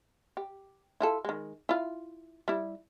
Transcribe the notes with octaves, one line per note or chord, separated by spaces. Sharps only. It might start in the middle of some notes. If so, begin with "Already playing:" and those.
G4
E4 F4 A4
D#3 G#3
E4 F4
G3 E4